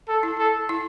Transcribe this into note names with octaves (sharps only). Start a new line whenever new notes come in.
A4
E4
A4
E4